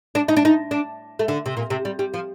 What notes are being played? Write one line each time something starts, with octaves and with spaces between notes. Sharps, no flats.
D4
D#4
D4
D#4
D4
A3
D3
C3
A#2
C3
G3
G3
F3